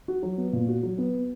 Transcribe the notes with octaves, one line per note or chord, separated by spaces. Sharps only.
F#4
F#3
B3
A#2
F#4
F#3
B3